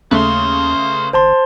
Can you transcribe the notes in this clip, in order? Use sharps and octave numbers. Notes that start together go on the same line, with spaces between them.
D#2 C#3 A3 B4 C6
G#1 C5 A5 C6